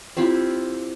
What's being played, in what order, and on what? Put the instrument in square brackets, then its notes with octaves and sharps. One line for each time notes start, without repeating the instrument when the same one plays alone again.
[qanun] C4 E4 F4 G4